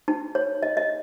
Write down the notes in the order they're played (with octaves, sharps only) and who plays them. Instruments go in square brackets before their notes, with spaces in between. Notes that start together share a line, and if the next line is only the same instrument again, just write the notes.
[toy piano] D#4
C#5
D#5
D#5